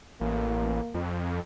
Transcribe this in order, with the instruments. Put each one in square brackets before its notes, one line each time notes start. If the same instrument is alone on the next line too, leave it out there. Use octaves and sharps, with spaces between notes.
[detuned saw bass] A1 [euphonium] A#3
[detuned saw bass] F2